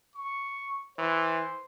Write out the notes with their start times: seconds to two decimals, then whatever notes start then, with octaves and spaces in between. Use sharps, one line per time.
0.14 C#6
0.98 E3 C5